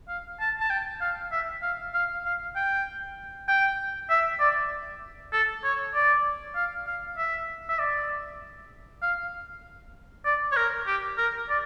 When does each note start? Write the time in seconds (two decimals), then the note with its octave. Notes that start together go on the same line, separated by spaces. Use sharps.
0.08 F5
0.40 A5
0.61 A5
0.70 G5
1.01 F5
1.32 E5
1.62 F5
1.94 F5
2.25 F5
2.56 G5
3.48 G5
4.10 E5
4.40 D5
5.33 A4
5.64 C#5
5.95 D5
6.56 F5
6.87 F5
7.18 E5
7.69 E5
7.79 D5
9.02 F5
10.25 D5
10.52 C#5
10.57 A#4
10.87 G4
11.18 A#4
11.49 D5